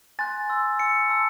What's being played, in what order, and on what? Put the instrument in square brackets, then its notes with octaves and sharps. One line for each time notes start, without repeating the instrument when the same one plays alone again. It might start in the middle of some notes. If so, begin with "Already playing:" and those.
[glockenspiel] G#5 C6 F#6 A6
G#5 C6 E6
G#5 C6 E6 C#7
A5 C6 E6